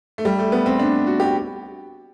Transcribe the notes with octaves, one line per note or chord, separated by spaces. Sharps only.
A3
G3
A3
B3
C4
D4
F#4
G4